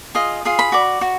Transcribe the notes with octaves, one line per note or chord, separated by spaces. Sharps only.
F4 G#4 D#5
F4 G#4
B5
F#4 D5
F#4